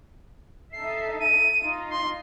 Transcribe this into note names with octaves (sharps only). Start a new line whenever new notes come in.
D#4 A4 E5 C7
D#7
D#4 F4
C6